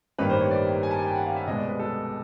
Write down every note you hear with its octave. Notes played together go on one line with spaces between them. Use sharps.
A1 G2 D#3 G3 A#3 B4
C5
C#5
D5
G#5
A5
G#5
G5
F#5
F5
E5
C2 B2 G#3 B3 D#5
D5
B4
A4